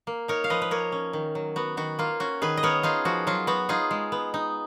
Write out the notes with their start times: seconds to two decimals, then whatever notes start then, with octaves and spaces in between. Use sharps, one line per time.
0.07 A#3
0.28 D#4 A#4 C#5
0.44 F5
0.50 F3 B4 D#5
0.62 B4
0.71 A#3 A#4 C#5
0.92 C#4
1.13 D#3
1.35 F#3
1.56 B3 F#4
1.77 D#3 F#4
1.99 A#3 F4
2.20 C#4 F#4
2.42 D#3 G#4 B4
2.57 D#5
2.63 B3 A#4 C#5
2.83 D#4 F4 G#4
3.05 F3 F#4
3.27 F#3 F4
3.47 B3 F#4
3.69 D#4 F4 G#4
3.91 G#3
4.12 B3
4.34 D#4